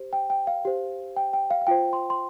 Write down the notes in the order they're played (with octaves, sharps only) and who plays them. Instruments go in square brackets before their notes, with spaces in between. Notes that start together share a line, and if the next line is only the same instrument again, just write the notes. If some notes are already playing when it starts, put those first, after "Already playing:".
Already playing: [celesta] G4 C5
G5
G5
F5
G4 C5
G5
G5
F5
F5
F4 C5 G5
C6
C6